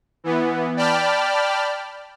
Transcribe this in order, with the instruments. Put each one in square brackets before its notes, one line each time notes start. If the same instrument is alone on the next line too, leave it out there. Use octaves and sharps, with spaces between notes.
[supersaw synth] E3 B3
D5 G5 A5 B5 F6